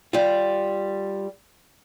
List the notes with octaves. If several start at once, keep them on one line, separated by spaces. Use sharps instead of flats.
G3 F4